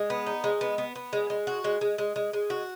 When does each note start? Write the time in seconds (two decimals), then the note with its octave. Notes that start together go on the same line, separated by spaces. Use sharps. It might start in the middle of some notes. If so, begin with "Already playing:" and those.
Already playing: G#3
0.10 B3
0.26 D#4
0.44 G#3
0.61 B3
0.78 B3
0.96 B3
1.13 G#3
1.30 G#3
1.47 F#4
1.64 G#3
1.81 G#3
1.98 G#3
2.16 G#3
2.33 G#3
2.50 F#4